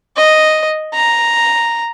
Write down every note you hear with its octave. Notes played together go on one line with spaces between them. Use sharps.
D#5
A#5